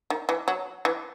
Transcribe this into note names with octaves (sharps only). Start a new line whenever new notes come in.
D#3
E3
F#3
E3